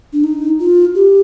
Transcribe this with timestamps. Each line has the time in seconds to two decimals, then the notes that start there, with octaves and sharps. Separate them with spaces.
0.13 D4
0.24 D#4
0.60 F4
0.95 G4